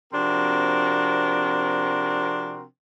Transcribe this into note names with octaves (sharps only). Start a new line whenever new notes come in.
C3 F3 C4 D4 F#4 A#4